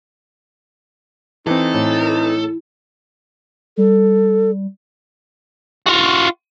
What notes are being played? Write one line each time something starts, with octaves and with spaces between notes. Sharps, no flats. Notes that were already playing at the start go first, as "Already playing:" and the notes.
E3 C4 D#4 A4
A2
G3 A4
F4 F#4